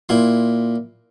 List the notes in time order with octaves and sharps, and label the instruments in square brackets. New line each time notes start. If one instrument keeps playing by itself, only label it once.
[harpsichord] A#2 E4 C6